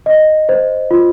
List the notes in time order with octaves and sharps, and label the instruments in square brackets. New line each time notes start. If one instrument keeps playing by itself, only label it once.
[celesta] D#5
C5
F4